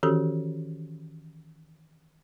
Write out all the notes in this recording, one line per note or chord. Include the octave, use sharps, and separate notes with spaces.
D#3 E3 C#4 F#4 G4 A4